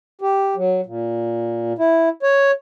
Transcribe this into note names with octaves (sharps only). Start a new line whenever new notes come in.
G4
F#3
A#2
E4
C#5